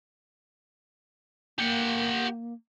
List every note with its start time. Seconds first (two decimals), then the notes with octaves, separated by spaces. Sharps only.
1.58 A#3 G4 F#5